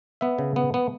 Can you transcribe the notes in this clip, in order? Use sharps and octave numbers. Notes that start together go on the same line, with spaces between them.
B3 E5
C#3
B3
B3